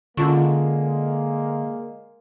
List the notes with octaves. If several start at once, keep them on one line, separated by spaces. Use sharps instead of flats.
D3 G#3 A#3 C#4 F4 C#6